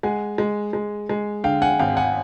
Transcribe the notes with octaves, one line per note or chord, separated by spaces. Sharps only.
G#3 F#5 G#5
G#3
G#3
G#3
D3 F5 G5
F#5 G#5
G#1 F5 G5
F#5 G#5